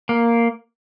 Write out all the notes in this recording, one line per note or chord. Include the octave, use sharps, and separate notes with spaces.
A#3